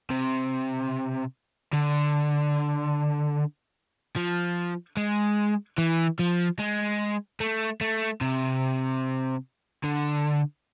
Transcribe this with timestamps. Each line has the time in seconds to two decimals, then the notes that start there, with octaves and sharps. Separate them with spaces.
0.10 C3
1.73 D3
4.16 F3
4.97 G#3
5.78 E3
6.19 F3
6.59 G#3
7.40 A3
7.81 A3
8.21 C3
9.84 D3